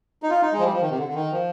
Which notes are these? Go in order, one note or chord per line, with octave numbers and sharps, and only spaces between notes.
D#4
F4
D#4
G#3
F3
G3
F3
D#3
C3
D3
D3
D#3
F3